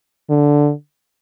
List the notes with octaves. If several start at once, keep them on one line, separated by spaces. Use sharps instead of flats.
D3